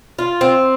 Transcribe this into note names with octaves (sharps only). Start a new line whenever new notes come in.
F4
C4